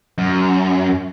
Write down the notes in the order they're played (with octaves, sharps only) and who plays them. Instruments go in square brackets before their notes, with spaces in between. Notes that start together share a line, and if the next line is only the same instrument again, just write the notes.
[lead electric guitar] F#2